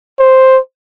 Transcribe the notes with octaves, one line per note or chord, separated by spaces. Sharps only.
C5